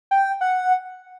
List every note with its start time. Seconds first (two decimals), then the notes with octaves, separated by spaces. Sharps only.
0.11 G5
0.41 F#5